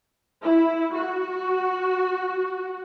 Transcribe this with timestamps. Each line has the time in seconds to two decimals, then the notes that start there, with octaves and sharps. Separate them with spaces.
0.42 E4
0.94 F#4